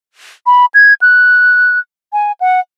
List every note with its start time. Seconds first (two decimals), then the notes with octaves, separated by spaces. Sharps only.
0.46 B5
0.74 G#6
1.02 F#6
2.13 G#5
2.40 F#5